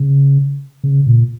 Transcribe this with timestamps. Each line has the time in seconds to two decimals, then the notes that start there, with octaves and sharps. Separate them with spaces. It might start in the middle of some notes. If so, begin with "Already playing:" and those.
Already playing: C#3
0.84 C#3
1.07 A#2